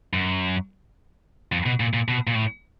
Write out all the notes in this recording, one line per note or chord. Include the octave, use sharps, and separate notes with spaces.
F#2
F2
B2
A#2
A#2
B2
A#2
A2